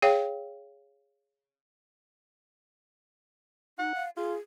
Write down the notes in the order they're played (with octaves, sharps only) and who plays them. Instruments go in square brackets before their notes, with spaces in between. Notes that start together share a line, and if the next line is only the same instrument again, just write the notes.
[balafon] G#4 C#5 F5 G5
[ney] D#4 [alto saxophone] F#5
[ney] F5
[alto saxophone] F4 [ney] G#4